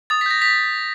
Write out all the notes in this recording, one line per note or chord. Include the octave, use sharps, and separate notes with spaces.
D#6 A6
B6
G6 A#6
D#6 B6